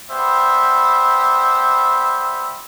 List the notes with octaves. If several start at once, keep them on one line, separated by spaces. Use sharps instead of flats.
G3 B3 G4 C5 E5